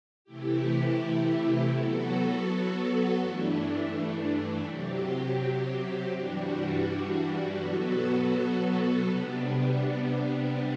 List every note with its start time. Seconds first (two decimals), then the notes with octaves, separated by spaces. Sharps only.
0.24 C3 E3 A3 E4 G4
1.71 F#3 B3 F#4 A4
3.18 G2 E3 A3 D4
4.65 C3 F#3 C4 G4
6.12 G2 E3 G3 D4 F#4
7.58 B2 F#3 B3 F#4 A4
9.04 C3 G3 B3 D4